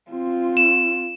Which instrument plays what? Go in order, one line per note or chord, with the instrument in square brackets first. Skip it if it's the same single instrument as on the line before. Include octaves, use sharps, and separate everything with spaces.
[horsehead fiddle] C4 F4
[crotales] E7